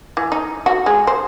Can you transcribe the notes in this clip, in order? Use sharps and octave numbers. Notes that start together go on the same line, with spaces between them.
E3
D#4
F#4
G#3
C5